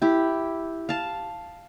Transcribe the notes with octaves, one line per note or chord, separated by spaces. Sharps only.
E4 G4
F5 A5